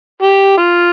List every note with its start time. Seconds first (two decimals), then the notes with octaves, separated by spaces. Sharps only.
0.22 G4
0.57 F4